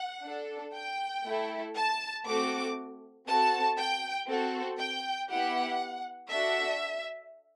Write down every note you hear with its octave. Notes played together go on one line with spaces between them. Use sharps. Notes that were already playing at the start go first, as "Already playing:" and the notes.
Already playing: F#5
D4 A4
G5
A3 E4 A4
A5
A3 C4 F#4 A4 D6
C4 F#4 A4 A5
G5
C4 F#4 A4
G5
B3 E4 G4 F#5
D4 F#4 A4 E5